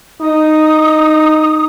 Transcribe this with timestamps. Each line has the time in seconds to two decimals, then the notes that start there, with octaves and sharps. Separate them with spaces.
0.21 D#4 D#6